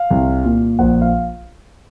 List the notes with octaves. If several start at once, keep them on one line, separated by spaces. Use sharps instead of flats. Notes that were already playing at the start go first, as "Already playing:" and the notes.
Already playing: F5
C2
A#2
A#1 F#5
F5